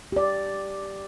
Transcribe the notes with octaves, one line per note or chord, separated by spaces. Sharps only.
G4 D5